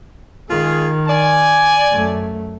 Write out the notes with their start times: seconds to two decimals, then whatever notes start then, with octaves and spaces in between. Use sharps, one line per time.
0.50 D#3 G#3 F4 G#4
1.09 D5 G#5
1.90 F#2 A3